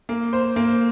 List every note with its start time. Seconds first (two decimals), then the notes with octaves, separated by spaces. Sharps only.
0.09 A#3
0.33 C5
0.56 A#3